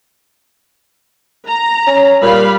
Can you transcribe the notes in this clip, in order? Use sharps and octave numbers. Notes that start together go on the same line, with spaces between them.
A#5
C#4
A#2 G3 F5 B5